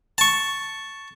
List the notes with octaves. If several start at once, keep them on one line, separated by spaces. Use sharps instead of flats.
A5 C#6